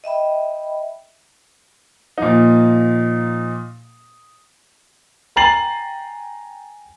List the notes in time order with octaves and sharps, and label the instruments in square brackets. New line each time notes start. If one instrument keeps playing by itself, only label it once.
[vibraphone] D#5 E5 G5 B5
[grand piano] A#2 F3 D#4
G5 G#5 A#5 A6 C7 F#7